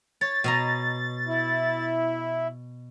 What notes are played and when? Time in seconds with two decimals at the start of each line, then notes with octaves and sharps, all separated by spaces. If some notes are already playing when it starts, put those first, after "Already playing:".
0.21 C#5 A6
0.44 B2 D#5 A#5
1.27 E4